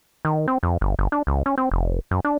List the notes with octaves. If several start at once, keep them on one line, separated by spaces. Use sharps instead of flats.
D#3
C4
F2
G1
G1
D4
C#2
C#4
C4
F1
F#2
D4